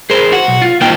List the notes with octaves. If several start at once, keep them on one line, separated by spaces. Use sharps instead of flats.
G#4 A#4 C5
F#4
B1
F4
F2 D#3 A#3 F4 G5